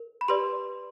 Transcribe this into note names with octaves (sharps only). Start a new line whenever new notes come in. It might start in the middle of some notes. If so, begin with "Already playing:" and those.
Already playing: A#4
B5
G4 B4 D5 C6